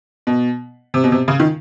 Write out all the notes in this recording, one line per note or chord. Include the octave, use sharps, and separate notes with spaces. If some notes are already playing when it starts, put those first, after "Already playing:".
B2
C3
B2
C3
C#3
D#3